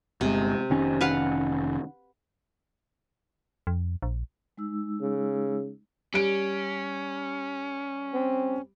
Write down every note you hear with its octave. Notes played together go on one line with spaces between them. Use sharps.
G1 C3 G#3
F1 D#3 C#4
B4 F5 F#5
F2
A#1
G#3 D#4 E6
C#3
G3 C#4 D7
C4